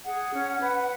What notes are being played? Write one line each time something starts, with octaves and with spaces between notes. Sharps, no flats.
G#4 F#5
C#4
B4